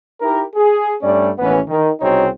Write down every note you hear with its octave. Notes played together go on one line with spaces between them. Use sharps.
D#4 E4 G4 A#4
G#4
G2 G3 A3 C#4 D5
A1 D#2 E3 B3 C#4 B4
D#3
C2 C#3 C4 D#4 F#4 C#5